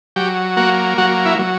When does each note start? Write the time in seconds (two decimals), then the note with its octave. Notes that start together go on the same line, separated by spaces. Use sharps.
0.16 F#3 G4
0.57 A#3 F#4
0.98 F#3 F#4
1.25 E4
1.39 F#3